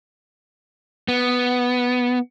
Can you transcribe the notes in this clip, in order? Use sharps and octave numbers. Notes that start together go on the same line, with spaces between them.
B3